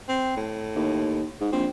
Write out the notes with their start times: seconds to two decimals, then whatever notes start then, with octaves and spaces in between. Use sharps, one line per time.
0.09 C4
0.37 A2
0.75 D#2
1.40 G#2
1.52 A#1 C4